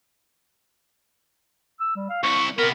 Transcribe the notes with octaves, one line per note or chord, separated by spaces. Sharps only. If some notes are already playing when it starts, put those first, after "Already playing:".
E6
G3
F5
C2 E4 C#6
C3 B3 A#4